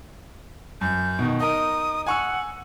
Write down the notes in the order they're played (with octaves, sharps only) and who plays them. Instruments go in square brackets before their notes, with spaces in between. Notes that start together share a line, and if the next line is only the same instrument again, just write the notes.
[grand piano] F#2 [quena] G6
[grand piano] B2 D#3
[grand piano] D#4 A#4 [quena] D#6
[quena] F#5 [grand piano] G#5 C#6 E6